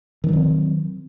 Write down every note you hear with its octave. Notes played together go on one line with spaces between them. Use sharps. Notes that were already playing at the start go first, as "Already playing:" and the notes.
D#3 F#3 C4